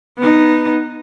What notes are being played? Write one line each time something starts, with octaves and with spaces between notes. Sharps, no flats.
B3 D#4